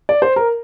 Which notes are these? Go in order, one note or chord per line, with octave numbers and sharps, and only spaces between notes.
D5
C5
A#4